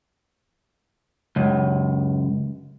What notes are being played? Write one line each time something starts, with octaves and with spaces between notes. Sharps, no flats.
C#2 F#2